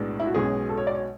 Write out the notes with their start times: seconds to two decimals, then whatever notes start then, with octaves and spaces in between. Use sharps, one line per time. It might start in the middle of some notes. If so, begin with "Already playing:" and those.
Already playing: B1 A2 G#3 B3 D4
0.20 E4
0.27 F#4
0.35 B1 B2 G#3 C#4 G#4
0.69 A4
0.77 C#5
0.87 D5
0.94 C#5